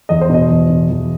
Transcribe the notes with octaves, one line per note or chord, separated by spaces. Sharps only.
E2 D#5
C5
B2 D#5
E2
B2
E2